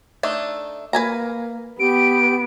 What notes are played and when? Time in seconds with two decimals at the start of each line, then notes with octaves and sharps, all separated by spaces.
0.23 A3 D4 D#4
0.93 A#3 B4 G#5 A#5
1.79 B3 G4 D7